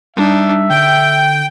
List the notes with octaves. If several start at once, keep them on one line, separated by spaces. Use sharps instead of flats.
G3 D4 D#4 E5
D3 G5 G6